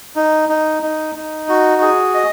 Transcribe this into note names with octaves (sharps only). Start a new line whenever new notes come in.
D#4
D#4
D#4
D#4
F#4
G#4
D#5